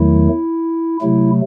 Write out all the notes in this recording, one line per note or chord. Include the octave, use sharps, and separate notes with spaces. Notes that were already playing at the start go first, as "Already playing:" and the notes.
Already playing: E2 D#3 F#3 A3 E4
C3 F#3 A3 E4